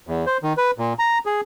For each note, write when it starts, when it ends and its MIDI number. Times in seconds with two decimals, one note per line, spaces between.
0.07 0.25 40
0.26 0.38 72
0.43 0.53 51
0.57 0.71 71
0.78 0.93 46
0.99 1.18 82
1.26 1.41 68